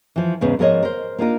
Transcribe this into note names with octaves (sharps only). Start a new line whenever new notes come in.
E3 F3
E2 G#2 C#3 B3 C#4
G#2 F3 A#4 C#5 D#5
A#4 C5
A#3 D4 D#4 F4 A#4